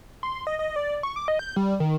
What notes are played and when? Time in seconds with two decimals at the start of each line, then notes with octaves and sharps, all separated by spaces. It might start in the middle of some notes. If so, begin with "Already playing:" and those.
0.23 C6
0.47 D#5
0.59 D#5
0.76 D5
1.03 C#6
1.16 D6
1.28 D#5
1.39 G6
1.56 G3
1.80 D#3